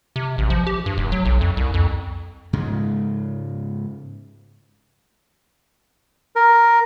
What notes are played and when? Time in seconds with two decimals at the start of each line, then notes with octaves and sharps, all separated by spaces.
0.16 C3
0.38 A1
0.50 F3
0.67 G4
0.86 G2
0.97 F1
1.12 F#3
1.25 B1
1.41 F2
1.57 C2
1.74 F2
2.53 G#2 C#3 G#3
6.36 A#4